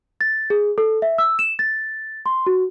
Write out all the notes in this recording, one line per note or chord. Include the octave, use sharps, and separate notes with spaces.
A6
G#4
A4
E5
E6
E7
A6
C6
F#4